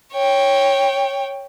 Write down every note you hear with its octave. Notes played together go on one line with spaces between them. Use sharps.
C#5 G5